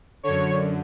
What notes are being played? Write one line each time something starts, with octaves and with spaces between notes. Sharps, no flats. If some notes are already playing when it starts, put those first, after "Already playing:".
F#2 D3 C#5